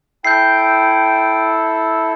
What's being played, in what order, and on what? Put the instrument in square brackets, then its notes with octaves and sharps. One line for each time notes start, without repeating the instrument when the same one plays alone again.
[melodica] E4 A4 [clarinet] G5 [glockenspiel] G6 C7